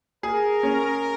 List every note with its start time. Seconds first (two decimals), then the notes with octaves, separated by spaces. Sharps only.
0.23 G#4 A#4
0.63 C#4